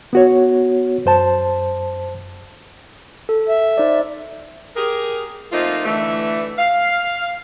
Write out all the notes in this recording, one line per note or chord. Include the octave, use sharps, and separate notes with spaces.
B3 F#4 C#5
F#2 C5 A5
A4
E5
D#4 C5 D5
G4 G#4 A#4
F3 A3 A#3 C4 D#4 F4
D3 E3 A3
F5